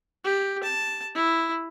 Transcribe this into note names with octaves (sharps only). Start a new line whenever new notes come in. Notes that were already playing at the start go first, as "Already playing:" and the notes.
G4
A5
E4